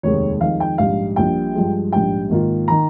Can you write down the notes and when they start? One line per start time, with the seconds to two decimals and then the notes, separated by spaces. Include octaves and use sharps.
0.03 F1 D#2 D#3 G#3 C#5
0.41 F2 D#3 G#3 C4 D#4 F5
0.60 G5
0.78 A#1 G#2 G3 F5
1.16 A#1 A#2 G3 G5
1.55 G2 F3 G#3
1.92 A#1 G#2 G3 G5
2.30 G#2 D#3 A#3 F4
2.68 D#3 A#5